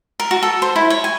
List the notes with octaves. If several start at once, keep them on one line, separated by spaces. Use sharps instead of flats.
A#4
F#4
A4
C5
E4
C#5
G#5